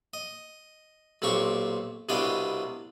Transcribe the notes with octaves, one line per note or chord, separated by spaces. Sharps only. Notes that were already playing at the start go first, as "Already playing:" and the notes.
D#5
B1 A#2 C4 G4 C#6
C2 B2 D4 D#5 F5 G5